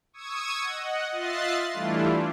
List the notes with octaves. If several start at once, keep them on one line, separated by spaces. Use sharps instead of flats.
C#6 D#6 E6 G#6
D#5 F#5
F4 D#5 E5 F#6 A6 C7
E3 G3 A3 D4 E4 F4